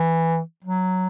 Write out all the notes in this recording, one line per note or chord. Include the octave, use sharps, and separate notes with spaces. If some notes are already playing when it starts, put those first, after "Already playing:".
Already playing: E3
F#3